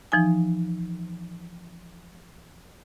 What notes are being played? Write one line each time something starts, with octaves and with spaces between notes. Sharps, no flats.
E3 F3 D#4 G#5